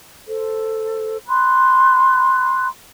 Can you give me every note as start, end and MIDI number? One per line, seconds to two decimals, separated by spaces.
0.28 1.17 69
0.28 1.17 72
1.27 2.68 83
1.27 2.68 84
1.27 2.68 90